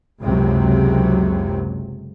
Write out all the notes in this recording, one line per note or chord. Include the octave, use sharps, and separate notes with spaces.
F#1 C#2 F#2 C3 F#3